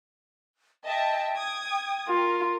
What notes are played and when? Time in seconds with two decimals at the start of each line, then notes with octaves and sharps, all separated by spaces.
0.85 D#5 E5 G5 A5
1.36 D#6 G#6
2.08 F4 A#4